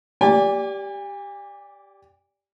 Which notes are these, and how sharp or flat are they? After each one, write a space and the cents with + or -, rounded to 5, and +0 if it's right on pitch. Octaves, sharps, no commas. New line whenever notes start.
G4 +0 D5 -15 G#5 -40